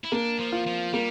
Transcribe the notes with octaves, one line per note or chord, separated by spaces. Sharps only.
E4
A#3 D4
F3
F4
F3
G3 A#3